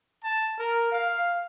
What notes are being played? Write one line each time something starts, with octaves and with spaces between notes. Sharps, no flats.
A5
A#4
F5